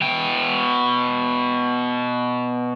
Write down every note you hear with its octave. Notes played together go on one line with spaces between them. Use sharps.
B2 G5